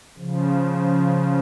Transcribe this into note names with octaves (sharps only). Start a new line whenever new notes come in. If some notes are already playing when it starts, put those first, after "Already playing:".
C#3 F3